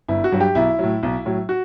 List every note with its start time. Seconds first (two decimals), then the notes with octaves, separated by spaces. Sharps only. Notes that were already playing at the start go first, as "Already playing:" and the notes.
0.08 G1 E4
0.24 F#4
0.32 G2 F#3
0.40 G4
0.55 B1 E4
0.79 A2 F#3
1.03 B1
1.25 A2 F#3
1.49 F#4